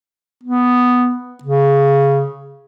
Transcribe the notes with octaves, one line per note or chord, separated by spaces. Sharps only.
B3
C#3